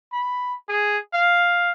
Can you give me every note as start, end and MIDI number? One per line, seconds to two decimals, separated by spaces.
0.12 0.54 83
0.69 0.98 68
1.14 1.71 77